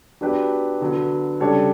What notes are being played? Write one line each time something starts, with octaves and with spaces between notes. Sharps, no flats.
F#3 B3 D4 G4 B4
D3 F#3 B3
C#3 G3 D4 A4 C#5